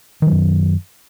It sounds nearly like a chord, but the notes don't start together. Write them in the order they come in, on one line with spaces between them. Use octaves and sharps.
D#3 F#3 F#2